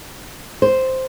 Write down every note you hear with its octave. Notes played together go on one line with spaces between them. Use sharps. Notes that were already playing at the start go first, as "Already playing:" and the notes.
C5